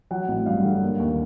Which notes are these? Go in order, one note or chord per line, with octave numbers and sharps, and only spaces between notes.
F#3 F#5
A1
G2 F5
D3
A#3
D#2